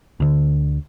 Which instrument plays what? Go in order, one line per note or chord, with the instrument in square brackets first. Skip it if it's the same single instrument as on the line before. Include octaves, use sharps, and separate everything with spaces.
[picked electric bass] D2 D3